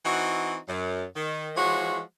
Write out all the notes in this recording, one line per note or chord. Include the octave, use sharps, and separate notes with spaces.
E3 C4 D#4 F#4
F#2
D#3
E3 F3 G#3 F#4 C#5